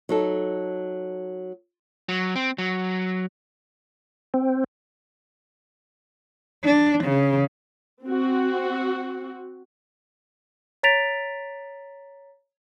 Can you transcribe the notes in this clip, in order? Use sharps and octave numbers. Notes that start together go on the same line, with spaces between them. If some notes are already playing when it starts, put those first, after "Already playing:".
F#3 D#4 A4
F#3
C4
F#3
C4
D4
C#3
C4 F#4
C#5 A#5 A6 B6 D7 F7